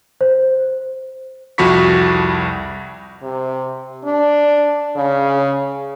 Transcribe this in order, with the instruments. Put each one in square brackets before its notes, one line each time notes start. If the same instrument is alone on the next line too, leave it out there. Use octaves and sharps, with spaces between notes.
[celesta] C5
[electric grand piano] C2 F2 F#4 B5 C#6 B6
[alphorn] C3
D4
C#3